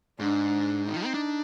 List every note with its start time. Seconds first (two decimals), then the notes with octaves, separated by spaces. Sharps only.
0.20 G#2 D4
0.88 D#3 D#4
0.96 F3
1.05 C4
1.14 D4